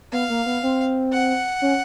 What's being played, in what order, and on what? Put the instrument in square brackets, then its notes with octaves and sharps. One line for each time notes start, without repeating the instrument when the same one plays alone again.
[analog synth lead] B3 [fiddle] F5
[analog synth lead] A#3
B3
C4
[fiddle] F#5
[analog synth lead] C#4